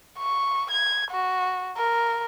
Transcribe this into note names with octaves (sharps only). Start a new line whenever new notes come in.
C#6
G#6
F#4
A#4